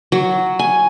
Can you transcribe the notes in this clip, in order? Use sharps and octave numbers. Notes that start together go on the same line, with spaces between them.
F#3
G#5